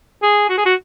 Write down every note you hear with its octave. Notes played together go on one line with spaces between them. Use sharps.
G#4
F#4
G#4
F#4